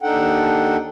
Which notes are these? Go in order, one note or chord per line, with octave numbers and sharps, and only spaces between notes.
D#2 D4 D#4 A4 F#5 G5